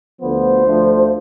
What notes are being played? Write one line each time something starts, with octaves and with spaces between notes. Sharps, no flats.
D2 D3 F3 B3 C5
D2 D3 F3 A3